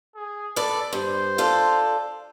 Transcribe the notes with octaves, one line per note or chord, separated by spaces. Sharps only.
G#4
A4 B4 D5
G2 C5
F4 A4 D5